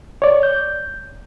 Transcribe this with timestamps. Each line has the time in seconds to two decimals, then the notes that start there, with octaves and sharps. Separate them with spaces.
0.22 C#5 D5
0.43 G6